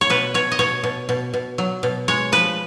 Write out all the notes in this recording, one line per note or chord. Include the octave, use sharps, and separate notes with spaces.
C#5
B2 B4
B2 C#5
D#5
B2 C#5
B2
B2
B2
F#3
B2
G#3 C#5
F3 B4